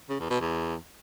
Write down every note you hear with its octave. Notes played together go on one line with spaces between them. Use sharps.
C#3
E2
B2
E2